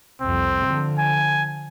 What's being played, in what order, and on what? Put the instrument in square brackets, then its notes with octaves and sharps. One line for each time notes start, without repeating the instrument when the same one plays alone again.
[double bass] C2 F2 [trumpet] C4
[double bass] D3 F3
[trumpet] G#5